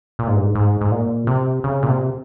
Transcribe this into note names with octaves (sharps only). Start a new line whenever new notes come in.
A#2
G#2
G2
G#2
G#2
G#2
A#2
C3
C#3
A#2
C3